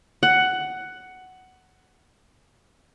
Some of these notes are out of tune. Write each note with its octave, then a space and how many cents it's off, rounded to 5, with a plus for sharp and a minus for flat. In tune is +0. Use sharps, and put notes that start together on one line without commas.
F#5 +10